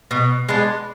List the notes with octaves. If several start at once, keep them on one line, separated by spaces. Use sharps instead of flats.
B2
G#3 B3 D4